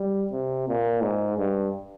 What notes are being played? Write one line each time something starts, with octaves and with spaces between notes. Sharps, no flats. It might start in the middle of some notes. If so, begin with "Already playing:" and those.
Already playing: G3
C3
A#2
G#2
G2